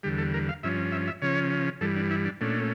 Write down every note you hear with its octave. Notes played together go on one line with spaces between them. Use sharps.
E2 D3 G3 G4
A4
A#4
F5
G2 F3 C#4 E5
E5
E5
C#3 F3 C#4 C#5
G2 E3 G3 A4
D4
E4
D4
A#2 A3 C#4 D4